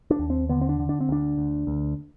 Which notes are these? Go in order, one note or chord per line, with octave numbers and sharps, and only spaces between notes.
D4
D#2
C4
D3 B3
C4
D4
D3
D4
C4
D2 D4
D2
D2